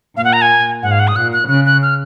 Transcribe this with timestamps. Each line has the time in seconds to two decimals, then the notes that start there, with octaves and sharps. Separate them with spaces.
0.17 A#2 F5
0.24 F#5
0.33 A#5
0.42 G#5
0.83 G#2 F#5
0.91 F5
0.99 F#5
1.08 D#6
1.16 A#2 F#6
1.33 F#6
1.49 C#3 F#6
1.66 F#6
1.82 F6